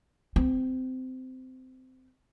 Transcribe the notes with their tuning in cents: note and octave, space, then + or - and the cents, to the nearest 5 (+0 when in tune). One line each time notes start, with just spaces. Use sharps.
C4 -20